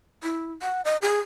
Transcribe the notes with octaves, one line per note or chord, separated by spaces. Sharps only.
E4
F#5
D#5
G#4